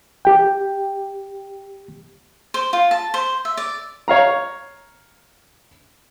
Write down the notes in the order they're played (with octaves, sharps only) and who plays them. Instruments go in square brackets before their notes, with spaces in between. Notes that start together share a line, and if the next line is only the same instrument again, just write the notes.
[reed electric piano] G4 G5
[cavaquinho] C5
F4
A5
C5
E5
D5
[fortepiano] C#5 F5 A#5